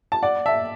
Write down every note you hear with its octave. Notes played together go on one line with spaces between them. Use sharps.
A5
D5 F#5
E5 A5